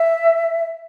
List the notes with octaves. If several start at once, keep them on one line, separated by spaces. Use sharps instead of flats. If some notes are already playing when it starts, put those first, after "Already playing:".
Already playing: E5